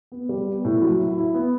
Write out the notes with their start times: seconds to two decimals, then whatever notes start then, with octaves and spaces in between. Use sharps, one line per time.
0.12 B3
0.29 G3
0.47 B3
0.65 A2
0.82 F#3
0.99 E4
1.17 E4
1.34 B3